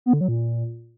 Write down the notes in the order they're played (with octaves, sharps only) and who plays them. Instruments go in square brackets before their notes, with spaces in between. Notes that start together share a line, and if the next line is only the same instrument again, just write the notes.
[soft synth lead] B3
D3
F#3
A#2